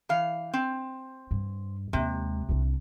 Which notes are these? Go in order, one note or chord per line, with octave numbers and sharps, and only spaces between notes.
E3 F5
C4
G2
D#2 C3 G#3
C2 D4